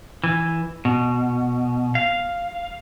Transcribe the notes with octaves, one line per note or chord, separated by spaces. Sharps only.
E3
B2
F5